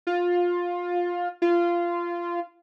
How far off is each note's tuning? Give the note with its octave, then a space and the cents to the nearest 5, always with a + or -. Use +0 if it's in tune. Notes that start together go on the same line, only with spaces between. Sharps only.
F4 +15
F4 -15